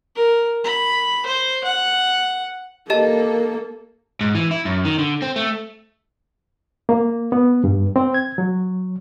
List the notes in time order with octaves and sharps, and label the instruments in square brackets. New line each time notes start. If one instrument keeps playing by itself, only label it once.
[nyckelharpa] A#4
B5
C5
F#5
[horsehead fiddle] A#3 [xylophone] G4 D#5 A5 [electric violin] A4
[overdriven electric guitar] G#2
E3
E4
F#2
D#3
D3
C4
A3
[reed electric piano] A#3
B3
G2
C4
G#6
F#3